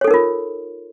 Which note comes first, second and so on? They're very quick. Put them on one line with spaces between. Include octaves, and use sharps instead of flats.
C#5 A4 D#4 A#4 F4